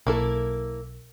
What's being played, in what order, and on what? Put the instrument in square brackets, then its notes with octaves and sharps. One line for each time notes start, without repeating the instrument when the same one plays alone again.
[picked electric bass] B1 [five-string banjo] A#3 E4 A4